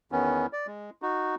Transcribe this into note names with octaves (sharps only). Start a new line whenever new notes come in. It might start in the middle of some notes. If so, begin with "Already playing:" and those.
E2 D#3 B3 C#4
D5
G#3
D#4 F#4